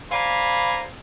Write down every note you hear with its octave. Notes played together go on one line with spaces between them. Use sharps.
C5 D5 F5 G#5 A#5 B5